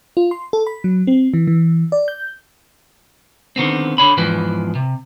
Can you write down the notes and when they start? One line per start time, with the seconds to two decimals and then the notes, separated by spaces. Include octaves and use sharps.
0.17 F4
0.31 C6
0.53 A4
0.67 B5
0.84 F#3
1.07 C4
1.34 E3
1.47 E3
1.92 D5
2.08 G6
3.56 D3 D#3 B3 C4
3.98 D3 C#5 B5
4.17 E2 G#2 E3 F3 B4
4.75 C3